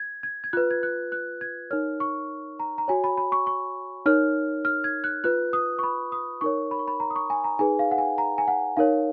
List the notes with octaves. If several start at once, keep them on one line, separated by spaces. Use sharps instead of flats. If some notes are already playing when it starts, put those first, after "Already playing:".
Already playing: G#6
G#6
G#6
F4 B4 F#6
G#6
F#6
F#6
G#6
D#4 A#4 C#5 F6
C#6
A#5
A#5
F#4 C#5 G#5
B5
B5
C#6
C#6
D#4 A#4 C#5 F6
F6
G#6
F#6
F4 B4 F#6
D#6
C#6
B5
D#6
D#4 A#4 C#5 C#6
B5
C#6
B5
A#5
D#6
C#6
G#5
A#5
D#4 G#4 B4 G#5
F5
F#5
G#5
A#5
G#5
F#5
D#4 A#4 C#5 F5